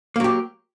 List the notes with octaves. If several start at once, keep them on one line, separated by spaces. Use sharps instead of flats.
F#3 A#3 G4